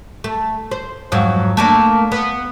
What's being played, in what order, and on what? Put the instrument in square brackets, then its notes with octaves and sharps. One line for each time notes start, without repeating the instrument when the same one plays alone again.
[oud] A3
C5
F2 G#2 F#3
A3 A#3 D4
B3